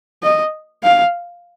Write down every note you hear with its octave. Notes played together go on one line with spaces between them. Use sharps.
D#5
F5